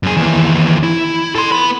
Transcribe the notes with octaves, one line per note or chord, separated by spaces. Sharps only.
F#2 G#4
D#2 E3
E4
A4 C6
B3 B5